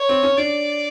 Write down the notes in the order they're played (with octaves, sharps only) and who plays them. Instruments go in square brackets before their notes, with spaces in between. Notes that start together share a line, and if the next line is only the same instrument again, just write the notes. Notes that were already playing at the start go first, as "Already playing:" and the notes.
Already playing: [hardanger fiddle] C#5
[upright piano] C4
C#4
[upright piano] D4 [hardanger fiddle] D5